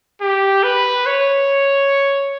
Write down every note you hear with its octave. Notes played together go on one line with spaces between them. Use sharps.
G4
B4
C#5